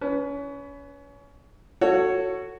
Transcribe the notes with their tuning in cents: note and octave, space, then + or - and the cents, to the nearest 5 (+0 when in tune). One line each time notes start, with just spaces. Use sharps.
C#4 +30 B4 +10
F#4 +0 A4 +20 C#5 +0